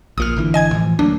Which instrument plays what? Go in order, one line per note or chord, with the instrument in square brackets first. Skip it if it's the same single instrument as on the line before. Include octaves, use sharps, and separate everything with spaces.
[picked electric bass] A#1 A#2 [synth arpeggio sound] D#6 F6
[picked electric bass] G#1 D3 E3
[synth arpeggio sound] D#5 G#5 G#6
[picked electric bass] A2 E3 F3
[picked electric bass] D2 F#3 A#3 [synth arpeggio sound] D4